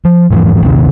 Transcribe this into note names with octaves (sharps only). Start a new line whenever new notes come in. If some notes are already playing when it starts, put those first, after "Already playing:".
F3
E1 G#2 E3 F3
A#1 D#2 C3 D#3